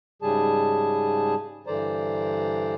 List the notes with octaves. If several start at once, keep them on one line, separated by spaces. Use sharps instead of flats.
G#2 C#3 G3 G#4 A5
G2 D3 E3 C5 D5 A#5